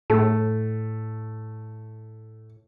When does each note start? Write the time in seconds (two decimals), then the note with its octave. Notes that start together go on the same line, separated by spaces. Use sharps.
0.10 A2 A3